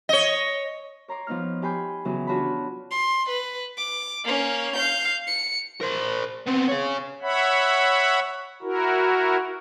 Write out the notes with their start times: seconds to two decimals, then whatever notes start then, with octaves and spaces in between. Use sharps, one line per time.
0.09 C#5 D#5
1.08 C#5 A#5 C6 D6
1.27 F3 B3 D#4 F6
1.62 G4 G5 G#5 B5 C6 G6
2.05 C#3 E3 F#3 B3 C#4
2.27 D4 F4 F#4 C#5 A5 B5
2.91 C6
3.29 B4
3.77 D6
4.24 A#3 C#4
4.76 F5 G6
5.27 C#7
5.81 A#4 C5
6.47 B3 C4
6.68 G#4 C#5
7.22 C#5 E5 F#5 B5
8.62 E4 F#4 A#4